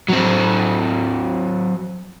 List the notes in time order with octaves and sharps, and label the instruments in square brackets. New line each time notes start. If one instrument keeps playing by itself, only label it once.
[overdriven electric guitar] F#3 C4